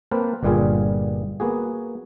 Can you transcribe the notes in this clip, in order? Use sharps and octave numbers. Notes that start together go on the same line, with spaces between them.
A#3 C4 B4 C5 F5 A5
G1 G2 A#2 G3 F4 G#4
A#3 B3 F#4 G#4